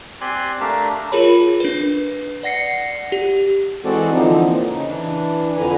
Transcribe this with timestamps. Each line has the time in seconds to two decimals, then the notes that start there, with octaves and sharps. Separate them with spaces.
0.21 C4 G4 D5 G#5 C6 F#6
0.61 A3 D4 G4 A#4 F5 A5
1.12 F4 G#4 A#4 C#5 B5
1.60 D4 B4
2.43 D5 F#5 A#6 C7 C#7
3.12 G4
3.85 E3 G#3 C4 F#4 A4 D5
4.12 D3 E3 F3 C4 D#4
4.44 A#2
4.68 C#3 D#4
4.88 E3 D4
5.57 F2 D3 B4 G#5 A#5